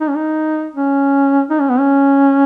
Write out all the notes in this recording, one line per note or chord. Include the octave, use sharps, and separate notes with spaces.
D#4
C#4
D#4
C#4
D#4
C#4
B3
C#4